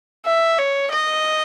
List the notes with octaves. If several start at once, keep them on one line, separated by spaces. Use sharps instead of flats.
E5
C#5
D#5